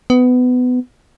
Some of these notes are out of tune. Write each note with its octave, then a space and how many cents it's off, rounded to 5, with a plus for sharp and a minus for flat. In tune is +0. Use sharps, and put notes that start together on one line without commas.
B3 +20